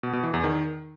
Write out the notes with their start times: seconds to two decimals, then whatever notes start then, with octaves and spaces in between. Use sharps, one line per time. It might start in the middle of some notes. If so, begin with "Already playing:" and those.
0.03 B2
0.13 B2
0.23 E3
0.34 E2
0.44 D#3